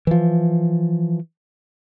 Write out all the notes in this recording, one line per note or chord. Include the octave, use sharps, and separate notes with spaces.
E3 F3